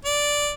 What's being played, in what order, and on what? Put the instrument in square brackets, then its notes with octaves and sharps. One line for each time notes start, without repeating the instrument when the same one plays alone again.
[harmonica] D5